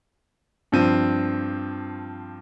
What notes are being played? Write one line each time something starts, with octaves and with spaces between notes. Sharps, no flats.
G2 F3 C4 D#7